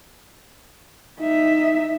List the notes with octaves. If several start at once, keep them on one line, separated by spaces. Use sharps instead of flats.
D#4 E5